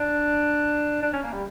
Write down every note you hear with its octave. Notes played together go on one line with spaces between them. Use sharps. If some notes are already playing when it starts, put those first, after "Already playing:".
Already playing: D4
D4
C#4
A#3
G3